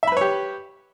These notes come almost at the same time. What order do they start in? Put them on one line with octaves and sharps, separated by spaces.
E5 B5 B4 C#5 G4